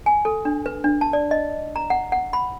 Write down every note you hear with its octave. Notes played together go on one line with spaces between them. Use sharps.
G#5
A4
D4
B4
D4
A5
D5
D#5
A#5
F#5
F#5
B5